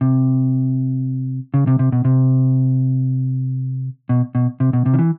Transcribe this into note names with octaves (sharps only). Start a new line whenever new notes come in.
C3
C#3
C3
C3
B2
C3
B2
B2
C3
B2
C3
D#3
E3